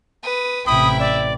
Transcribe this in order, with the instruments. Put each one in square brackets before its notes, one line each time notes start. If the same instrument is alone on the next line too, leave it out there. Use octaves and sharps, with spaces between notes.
[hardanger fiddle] B4 D#6
[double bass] A1 C3 [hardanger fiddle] E4 G5 [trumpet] B5 [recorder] D#6
[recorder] D5 [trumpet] E5